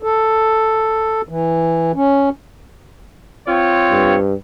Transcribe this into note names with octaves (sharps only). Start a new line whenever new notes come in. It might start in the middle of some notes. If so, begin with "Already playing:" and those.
A4
E3
C#4
C4 F4 C#5
G2